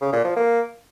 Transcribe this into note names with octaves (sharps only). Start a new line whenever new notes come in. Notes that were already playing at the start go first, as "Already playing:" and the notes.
C#3
A#2
F3
A#3